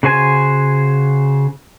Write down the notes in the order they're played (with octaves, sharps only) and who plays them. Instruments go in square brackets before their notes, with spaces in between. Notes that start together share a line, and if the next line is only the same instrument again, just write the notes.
[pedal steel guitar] C#3 F#4 C5 G#5